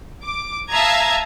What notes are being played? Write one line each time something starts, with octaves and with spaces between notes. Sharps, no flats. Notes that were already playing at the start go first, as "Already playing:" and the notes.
D6
E5 F5 A5 A#5 D#6 G#6